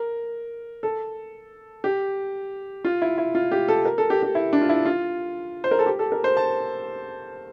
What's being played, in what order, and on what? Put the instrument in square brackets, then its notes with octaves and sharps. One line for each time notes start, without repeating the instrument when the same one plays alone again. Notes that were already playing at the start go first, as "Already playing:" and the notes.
Already playing: [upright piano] A#4
A4
G4
F4
E4
E4
F4
G4
A4
A#4
A4
G4
G4
E4
D4
F4
E4
F4
C5
A#4
A4
G4
A4
A#4
C5
A5